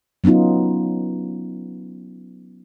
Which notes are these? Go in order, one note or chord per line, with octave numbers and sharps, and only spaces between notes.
F#3 B3 C#4 D#4 F4